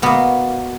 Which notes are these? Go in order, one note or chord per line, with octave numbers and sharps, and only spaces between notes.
B2 A#3 B3